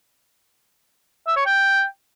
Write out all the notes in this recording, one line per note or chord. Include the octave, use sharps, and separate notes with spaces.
E5
C#5
G5